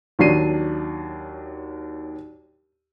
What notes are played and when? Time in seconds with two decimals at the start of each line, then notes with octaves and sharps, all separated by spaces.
0.19 D#2 F#3 D4 C7 D#7